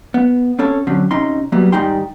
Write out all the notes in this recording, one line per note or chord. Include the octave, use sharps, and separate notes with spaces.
B3
C4 C#4 A4 C#5
D3 F#3 C4 C#4
C3 C#4 D#4 C6
F#3 G3 A#3 B3
G#2 D#3 G3 D#4 G5 C6